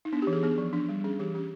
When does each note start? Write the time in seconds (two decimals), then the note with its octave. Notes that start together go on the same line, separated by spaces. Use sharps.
0.05 D#4
0.13 B3 D4
0.22 E3 G4
0.33 G#4
0.43 B3 G#4
0.58 F3
0.73 D4
0.89 G3
1.04 C#4 G#4
1.19 E3 G4
1.35 C#4 G4